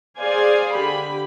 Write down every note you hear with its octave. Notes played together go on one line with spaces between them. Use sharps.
G#4 C5 D5 F5 G#5
D3 G4 B5